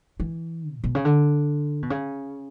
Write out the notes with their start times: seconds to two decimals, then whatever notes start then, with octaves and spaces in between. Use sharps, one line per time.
0.20 E3
0.73 A#2
0.84 B2
0.95 C#3
1.05 D3
1.83 B2
1.90 C#3